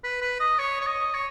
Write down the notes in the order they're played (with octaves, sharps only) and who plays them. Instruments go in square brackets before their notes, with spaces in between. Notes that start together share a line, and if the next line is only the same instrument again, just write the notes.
[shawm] B4
B4
D#5
C#5
C#5
D#5
C#5